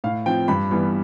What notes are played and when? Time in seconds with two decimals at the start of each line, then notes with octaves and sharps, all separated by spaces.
0.04 A2 F5
0.26 F3 C4 G5
0.48 G2 B5
0.71 E3 G3 B3